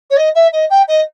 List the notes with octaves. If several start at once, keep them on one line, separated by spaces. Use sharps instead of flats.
C#5
D#5
E5
D#5
G5
D#5